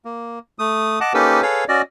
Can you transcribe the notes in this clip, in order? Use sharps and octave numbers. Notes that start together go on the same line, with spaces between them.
A#3
A3 D#6
D#5 F#5 A5 D6
A#3 C#4 D#4 G4 A4 B4
G#4 A4 B4 C#5 F5
C#4 F#4 D5 D#5